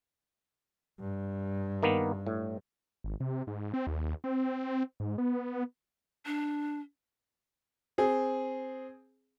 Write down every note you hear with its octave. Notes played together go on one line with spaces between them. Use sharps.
G2
D#3 A#3 B3
A2
G#1
C3
G#2
C4
D#2
C4
G#2
B3
D4
C4 G#4